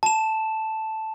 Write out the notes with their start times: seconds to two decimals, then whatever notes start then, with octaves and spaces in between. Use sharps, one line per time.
0.03 A5 E7